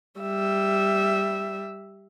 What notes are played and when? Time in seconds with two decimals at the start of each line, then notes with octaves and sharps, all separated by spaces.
0.21 G3 E5